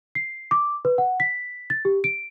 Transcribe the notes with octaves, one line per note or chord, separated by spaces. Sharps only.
C7
D6
B4
F#5
B6
A6
G4
D7